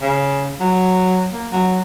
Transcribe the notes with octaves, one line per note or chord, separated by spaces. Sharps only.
C#3
F#3
A#3
F#3